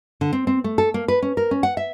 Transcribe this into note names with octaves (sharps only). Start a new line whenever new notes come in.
D3
C4
C4
A3
A4
A#3
B4
C#4
A#4
C#4
F#5
E5